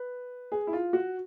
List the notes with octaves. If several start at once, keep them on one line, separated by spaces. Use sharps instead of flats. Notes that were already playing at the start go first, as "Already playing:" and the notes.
Already playing: B4
G#4
E4
F4
F#4